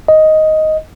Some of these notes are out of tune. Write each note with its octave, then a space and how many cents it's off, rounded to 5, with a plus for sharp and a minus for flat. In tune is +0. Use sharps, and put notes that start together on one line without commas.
D#5 +5